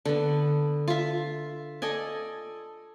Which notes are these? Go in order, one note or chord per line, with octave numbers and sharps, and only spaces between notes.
D3 B3
F4 E5
A4 D5 D#5 G#5